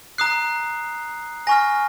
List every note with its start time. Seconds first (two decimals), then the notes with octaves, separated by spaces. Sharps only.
0.18 A#5 D#6 F#6 C7
1.47 G#5 C#6 F6 A#6